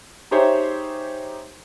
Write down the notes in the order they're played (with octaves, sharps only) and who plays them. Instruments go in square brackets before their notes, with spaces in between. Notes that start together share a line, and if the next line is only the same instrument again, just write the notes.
[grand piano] D#4 G4 G#4 C5 C#5 E5